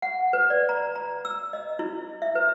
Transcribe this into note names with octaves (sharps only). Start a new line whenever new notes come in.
F#5
B4
D5
A#5
A#5
E6
D#5
E4
E5
B4